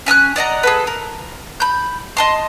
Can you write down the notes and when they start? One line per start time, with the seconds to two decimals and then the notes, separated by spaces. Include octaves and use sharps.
0.06 C#4 G#5 E6 F#6
0.36 D5 D#5 F#5 A#5
0.63 G#4 A4 B4
0.87 A#4
1.60 B5 G6
2.17 D#5 A5 C6